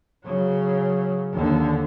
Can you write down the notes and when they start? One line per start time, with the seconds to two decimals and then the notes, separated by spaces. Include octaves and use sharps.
0.25 C#3 F#3
1.32 D#2 D3